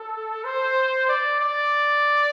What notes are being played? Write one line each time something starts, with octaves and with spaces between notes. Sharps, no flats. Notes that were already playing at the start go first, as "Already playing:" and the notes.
Already playing: A4
C5
D5
D5